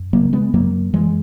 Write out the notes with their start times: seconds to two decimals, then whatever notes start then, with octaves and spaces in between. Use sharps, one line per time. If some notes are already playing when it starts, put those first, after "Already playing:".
Already playing: F#2
0.13 C#3 F#3 A#3
0.33 G#3 B3
0.54 F#2 F#3 A#3
0.94 F#2 E3 G#3